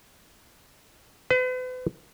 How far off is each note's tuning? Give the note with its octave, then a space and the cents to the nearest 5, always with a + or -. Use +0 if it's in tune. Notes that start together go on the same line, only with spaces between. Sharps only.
B4 +40